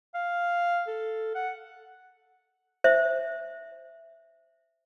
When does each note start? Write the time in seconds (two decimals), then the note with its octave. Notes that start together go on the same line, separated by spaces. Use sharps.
0.15 F5
0.88 A4
1.35 F#5
2.84 C5 E5